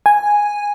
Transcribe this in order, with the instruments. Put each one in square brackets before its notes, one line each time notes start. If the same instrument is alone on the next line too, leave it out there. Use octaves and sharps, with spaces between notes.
[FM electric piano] G#5